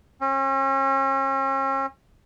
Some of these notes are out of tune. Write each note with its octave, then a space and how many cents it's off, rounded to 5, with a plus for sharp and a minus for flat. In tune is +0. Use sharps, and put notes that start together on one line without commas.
C#4 -40